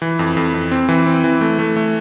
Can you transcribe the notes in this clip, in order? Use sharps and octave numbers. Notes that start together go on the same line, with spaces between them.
E3
F2
F2
F2
C4
E3
C4
E3
A3
A3
A3